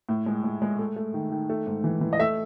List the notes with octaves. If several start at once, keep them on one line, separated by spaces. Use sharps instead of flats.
A2
G#3
G#3
G#3
A3
A3
D#3
D#3
A3
G#2
E3
E3
D#5
A3 E5